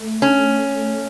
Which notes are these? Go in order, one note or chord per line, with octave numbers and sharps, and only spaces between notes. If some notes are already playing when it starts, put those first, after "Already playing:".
Already playing: A3
C#4